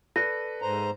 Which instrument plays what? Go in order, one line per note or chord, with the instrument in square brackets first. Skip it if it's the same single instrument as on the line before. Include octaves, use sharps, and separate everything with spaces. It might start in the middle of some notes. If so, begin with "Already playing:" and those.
[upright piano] A4 B4 D5 [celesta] A#6
[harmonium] G#2 C5 A#5